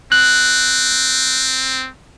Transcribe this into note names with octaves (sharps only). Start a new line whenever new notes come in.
C4 F#6